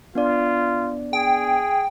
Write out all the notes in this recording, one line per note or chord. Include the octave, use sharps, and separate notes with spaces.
B3 D4 F4 D5
G#4 G5